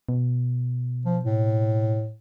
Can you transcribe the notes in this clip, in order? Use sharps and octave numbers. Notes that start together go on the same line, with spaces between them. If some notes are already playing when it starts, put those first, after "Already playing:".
B2
F3
A2